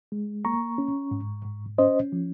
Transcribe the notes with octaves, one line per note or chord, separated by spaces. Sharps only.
G#3
A#3 A#5 C#6
C#4
G#2
G#2
C#4 C5 D#5
F3